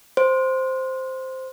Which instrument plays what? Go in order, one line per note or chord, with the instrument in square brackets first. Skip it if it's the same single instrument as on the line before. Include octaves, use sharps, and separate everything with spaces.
[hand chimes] C5